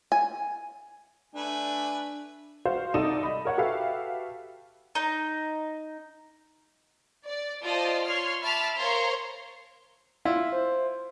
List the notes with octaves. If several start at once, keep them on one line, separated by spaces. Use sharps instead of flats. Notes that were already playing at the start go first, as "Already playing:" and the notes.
G#5
A3 D4 B4 G#5
F#4 C5 F5
C2 D#4 A4 D5 D#6 E7
D#5 B5
A#4 C#5 F#5
F#4 G4 A4 B4 E5 F5
D#4
D5
F4 C5 D5 D#5 A5
C#5 C6 F6
E5 A5 B5 D6 F6
A#4 C5 C#5 F5 A#5 C6
E4 F4 E5
C5